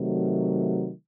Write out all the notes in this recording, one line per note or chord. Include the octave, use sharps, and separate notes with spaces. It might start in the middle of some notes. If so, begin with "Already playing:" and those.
Already playing: C3 D#3 F#3 A3